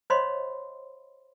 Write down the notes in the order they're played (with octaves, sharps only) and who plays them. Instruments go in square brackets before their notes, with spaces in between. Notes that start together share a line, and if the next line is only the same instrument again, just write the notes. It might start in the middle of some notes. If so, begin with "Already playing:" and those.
[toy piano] C5 C#5 D#5 F5 B5 C6